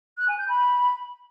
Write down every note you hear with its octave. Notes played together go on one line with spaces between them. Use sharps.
F#6
G#5
G6
B5